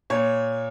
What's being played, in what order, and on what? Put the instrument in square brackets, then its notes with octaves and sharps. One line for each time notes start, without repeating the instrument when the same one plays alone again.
[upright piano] A#2 C#5